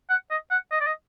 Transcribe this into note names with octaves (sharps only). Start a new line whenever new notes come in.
F#5
D#5
F#5
D#5
D5
D#5